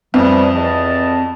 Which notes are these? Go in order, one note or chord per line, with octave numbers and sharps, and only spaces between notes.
F2 E3 F3 G3
E2 D#5 A5